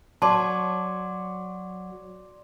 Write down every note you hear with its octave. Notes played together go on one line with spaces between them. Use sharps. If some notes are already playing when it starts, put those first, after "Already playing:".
F#3 D5 A5 C6 D6